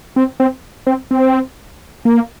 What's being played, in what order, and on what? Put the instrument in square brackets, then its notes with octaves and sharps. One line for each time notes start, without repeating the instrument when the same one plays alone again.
[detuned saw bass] C4
C4
C4
C4
A#3